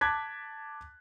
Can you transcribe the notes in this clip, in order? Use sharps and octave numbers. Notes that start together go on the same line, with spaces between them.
A5 D6 F#6 G#6 A6 B6